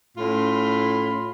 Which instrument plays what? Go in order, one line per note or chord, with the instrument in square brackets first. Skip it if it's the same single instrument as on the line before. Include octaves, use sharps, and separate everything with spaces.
[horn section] A2 C#4 F4 B5 C6